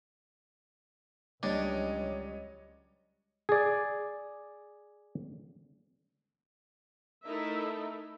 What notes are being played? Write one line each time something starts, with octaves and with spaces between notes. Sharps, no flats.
C#2 F#3 G3 D4 C#5 D#5
G#4 D5
A3 D#4 E4 A4 A#4 E5